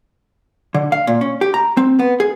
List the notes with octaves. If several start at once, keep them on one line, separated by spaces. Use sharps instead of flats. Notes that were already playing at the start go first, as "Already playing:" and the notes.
D3
F5
A#2
C#4
G4
A#5
C4
B3
G#4